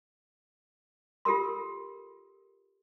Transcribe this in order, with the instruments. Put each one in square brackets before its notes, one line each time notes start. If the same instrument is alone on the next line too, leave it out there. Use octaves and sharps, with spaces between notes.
[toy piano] F4 G4 A4 A#4 C6